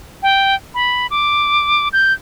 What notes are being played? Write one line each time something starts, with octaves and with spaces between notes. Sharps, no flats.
G5
B5
D6
G6